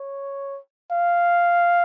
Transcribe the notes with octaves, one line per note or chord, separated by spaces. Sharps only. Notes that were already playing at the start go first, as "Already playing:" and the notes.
Already playing: C#5
F5